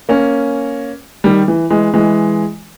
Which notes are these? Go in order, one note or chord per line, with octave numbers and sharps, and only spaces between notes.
A#3 C#4
D#3 G3
E3
E3 G#3
E3 G#3